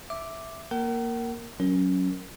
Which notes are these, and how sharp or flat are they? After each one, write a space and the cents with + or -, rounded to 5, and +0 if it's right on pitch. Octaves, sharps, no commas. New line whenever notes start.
E5 +0 D6 +0
A#3 +0 A#4 -10 F#5 +45
F#3 +0 C#4 +0 A#4 +0